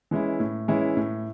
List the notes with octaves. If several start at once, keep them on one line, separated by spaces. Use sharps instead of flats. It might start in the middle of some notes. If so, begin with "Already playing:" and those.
E3 G#3 C#4 E4
A2
E3 G#3 C#4 E4
A2